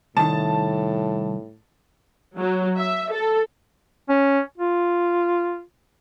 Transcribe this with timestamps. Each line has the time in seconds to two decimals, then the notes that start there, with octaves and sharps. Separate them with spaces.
0.17 C2 A2 D#3 A5
2.37 F#3
2.77 E5
3.12 A4
4.09 C#4
4.58 F4